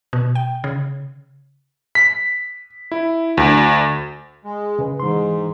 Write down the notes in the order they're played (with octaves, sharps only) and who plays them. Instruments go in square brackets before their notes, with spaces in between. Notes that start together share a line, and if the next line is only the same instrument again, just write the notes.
[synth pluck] B2
G5
C#3
[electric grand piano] B6
E4
D2
[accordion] G#3
[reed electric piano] C#3 B4
[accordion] G#2 [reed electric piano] E3 C6